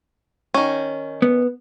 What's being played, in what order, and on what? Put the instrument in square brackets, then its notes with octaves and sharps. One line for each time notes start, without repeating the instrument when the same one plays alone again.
[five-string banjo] D#3 C#4
[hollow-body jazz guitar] B3